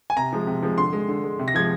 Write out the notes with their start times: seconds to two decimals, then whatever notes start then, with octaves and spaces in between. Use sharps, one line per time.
0.10 G#5
0.17 C3 A#5
0.33 F3 G#3
0.47 C3
0.63 F3 G#3
0.78 D3 C6
0.93 G#3
1.08 D3
1.24 G#3
1.39 C3
1.48 A#6
1.54 F3 G#3 G#6